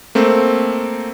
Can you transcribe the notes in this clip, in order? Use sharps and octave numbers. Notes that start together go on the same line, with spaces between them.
A3 A#3 C4